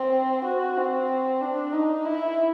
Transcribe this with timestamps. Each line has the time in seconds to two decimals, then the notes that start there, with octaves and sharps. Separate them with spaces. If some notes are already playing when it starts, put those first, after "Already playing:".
Already playing: C4
0.45 F#4
0.77 C4
1.41 D4
1.73 D#4
2.05 E4